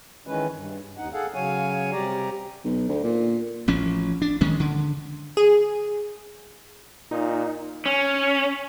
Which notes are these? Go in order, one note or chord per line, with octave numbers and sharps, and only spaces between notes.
D#3 E3 G#3 C#4 B4
G2
D#2 D#4 F#5
G#4 A4 F5 F#5
C#3 F#3 C#5 F5 G#5
C3 G3 G4 D5 A#5
B1
D2
A#2
A1 F3 C#4
D4
D#3 G#3 C#4
D3
G#4
A#2 D#4
C#4